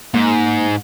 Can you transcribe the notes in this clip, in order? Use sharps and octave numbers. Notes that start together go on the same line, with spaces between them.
G#2 A#3